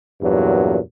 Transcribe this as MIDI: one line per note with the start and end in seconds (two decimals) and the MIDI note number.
0.22 0.78 40
0.22 0.78 43
0.22 0.78 46
0.22 0.78 54